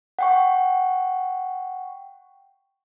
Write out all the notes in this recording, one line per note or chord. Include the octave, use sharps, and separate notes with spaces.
F#5 G5 C#6